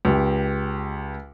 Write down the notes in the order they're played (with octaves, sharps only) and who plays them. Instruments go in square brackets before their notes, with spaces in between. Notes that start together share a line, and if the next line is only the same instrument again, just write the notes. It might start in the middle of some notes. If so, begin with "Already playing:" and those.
[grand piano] C#2 G4